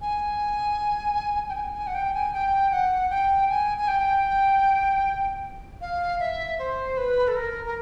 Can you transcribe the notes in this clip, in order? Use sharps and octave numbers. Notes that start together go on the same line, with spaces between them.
G#5
G5
G#5
G#5
F#5
G5
G#5
G5
F#5
G5
G#5
G#5
G5
F5
E5
C5
B4
A4
A#4
A#4